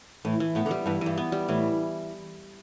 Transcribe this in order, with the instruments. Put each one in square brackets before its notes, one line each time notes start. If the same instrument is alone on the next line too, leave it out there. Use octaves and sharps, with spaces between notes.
[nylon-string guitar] A2 [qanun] E3
[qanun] E3
[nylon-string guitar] A2 [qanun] B3
[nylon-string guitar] D3
[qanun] G3
[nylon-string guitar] G2 [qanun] E3
[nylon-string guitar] G2 [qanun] E3
[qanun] B3
G3
[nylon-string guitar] A2 [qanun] E3